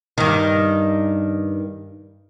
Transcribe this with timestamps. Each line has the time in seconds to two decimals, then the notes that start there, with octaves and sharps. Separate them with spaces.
0.18 G2 D#3